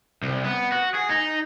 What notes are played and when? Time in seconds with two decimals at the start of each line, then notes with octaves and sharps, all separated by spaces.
0.23 C2
0.45 B3
0.72 F#4
0.95 G#4
1.10 D#4